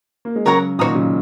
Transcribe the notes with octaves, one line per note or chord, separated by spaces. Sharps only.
A#3
G#3
C#3 F#3 A#4 C#5 F#5 A#5
A#2 D#3 F#4 C#5 A#5 D#6
C#3 F#3